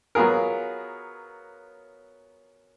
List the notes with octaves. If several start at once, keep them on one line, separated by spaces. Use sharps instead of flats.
F#3 B3 F4 G#4 A#4